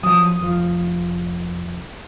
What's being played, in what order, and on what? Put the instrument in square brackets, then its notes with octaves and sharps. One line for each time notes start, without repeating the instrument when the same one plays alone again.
[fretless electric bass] F3 F#3 [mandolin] D#6
[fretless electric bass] F1 F3